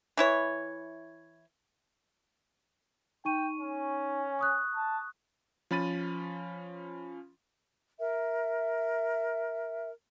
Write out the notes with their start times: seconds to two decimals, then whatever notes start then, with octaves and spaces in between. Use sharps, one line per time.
0.17 E3 E4 C#5
3.25 D#4 G5 C#6 D#7
3.59 C#4
4.39 C#6 D#6 F#6
4.75 A5
5.71 F3 C#4 B5 A6 D#7
7.99 A#4 E5